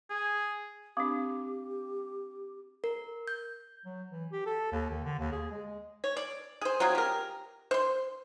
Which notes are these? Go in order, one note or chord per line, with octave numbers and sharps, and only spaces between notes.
G#4
C4 D4 G4 F5 D6 D#6
A#4
G6
F#3
E3
G4
A4
D#2
D#3
D3
D#2
G#4
G#3
C#5
D5
G#4 C5
F#3 C4 F4 G#4
G4 A#4
C5 C6